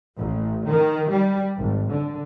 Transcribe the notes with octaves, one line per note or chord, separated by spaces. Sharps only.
A1
D#3
G3
G#1
D3